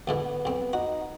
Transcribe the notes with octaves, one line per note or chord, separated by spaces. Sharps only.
D2 G#2 E3 B3
B1 C4
D#4 F#4